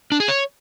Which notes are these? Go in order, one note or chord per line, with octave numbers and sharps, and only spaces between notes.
D4
G#4
C#5